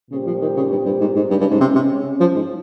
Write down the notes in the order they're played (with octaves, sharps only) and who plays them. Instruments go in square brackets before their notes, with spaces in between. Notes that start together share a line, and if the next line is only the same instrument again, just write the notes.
[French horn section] A#2 G3 C4 G4 C5 [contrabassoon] C#3
[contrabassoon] F3
D#3
C#3
G2
G2
G#2
G#2
[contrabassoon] G2 [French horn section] C#3 G#3 C#4
[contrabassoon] G2
G#2
C3
C3
F3
G#2